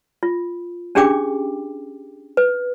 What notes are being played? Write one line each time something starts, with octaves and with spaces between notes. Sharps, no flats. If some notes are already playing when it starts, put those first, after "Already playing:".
F4
C#4 D4 G4 G#4 G5 D6
B4